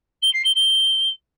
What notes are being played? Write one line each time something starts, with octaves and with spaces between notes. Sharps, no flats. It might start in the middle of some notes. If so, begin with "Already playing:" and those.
G7
C7
G7
G7